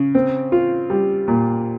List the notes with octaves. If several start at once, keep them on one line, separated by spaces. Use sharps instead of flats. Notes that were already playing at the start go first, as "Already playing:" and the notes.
Already playing: C#3
C4
F4
G3
A#2